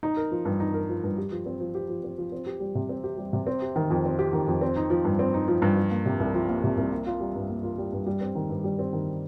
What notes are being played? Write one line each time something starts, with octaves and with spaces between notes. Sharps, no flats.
D#4
A#4
F3
G2
D#4
A#4
F3
G2
G4
F3
C4
F3
G4
F3
C4
F3
C4
G4
G3
C3
C4
G4
G3
C3
C4
G4
D#3
F2
C4
G4
D#3
F2
C4
D#4
F3
G2
C4
D#4
F3
G2
F3
A#3
C3
C2
F3
A#3
C3
C2
A#3
F4
G3
G2
A#3
F4
G3
G2
G3
C4
D#3
G2
G3
C4
D#3